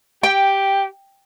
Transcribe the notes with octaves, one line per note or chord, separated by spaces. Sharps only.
G4 G5